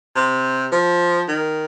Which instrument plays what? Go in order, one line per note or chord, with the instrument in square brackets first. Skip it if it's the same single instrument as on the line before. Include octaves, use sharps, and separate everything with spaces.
[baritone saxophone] C3
F3
D#3